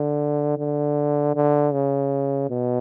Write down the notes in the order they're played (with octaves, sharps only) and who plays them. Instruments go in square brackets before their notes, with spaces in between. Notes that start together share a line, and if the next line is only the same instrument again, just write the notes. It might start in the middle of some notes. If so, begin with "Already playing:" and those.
Already playing: [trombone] D3
D3
D3
C#3
B2